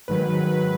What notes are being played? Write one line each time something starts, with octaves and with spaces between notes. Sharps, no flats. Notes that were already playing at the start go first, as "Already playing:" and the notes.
G#2 D#3 F#3 B4
B4